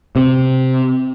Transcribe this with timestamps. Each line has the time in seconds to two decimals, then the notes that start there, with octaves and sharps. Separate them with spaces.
0.16 C3